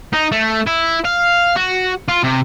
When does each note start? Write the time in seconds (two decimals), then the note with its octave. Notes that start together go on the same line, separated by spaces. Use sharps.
0.13 D#4
0.32 A3
0.67 E4
1.05 F5
1.56 F#4
2.08 F4
2.24 C3